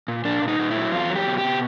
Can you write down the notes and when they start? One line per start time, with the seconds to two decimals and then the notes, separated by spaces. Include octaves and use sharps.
0.08 A#2
0.25 A#2 D4
0.42 A#2
0.48 D#4
0.59 A#2
0.70 E4
0.76 F#3
0.92 E2 F4
1.10 F#3
1.16 G4
1.27 B2
1.38 G4
1.44 B2